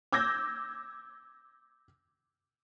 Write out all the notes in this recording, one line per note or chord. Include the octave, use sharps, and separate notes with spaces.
D6 E6 G6 G#6 A#6